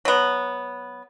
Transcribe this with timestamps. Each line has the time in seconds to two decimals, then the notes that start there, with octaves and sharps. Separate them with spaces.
0.05 F#3 B3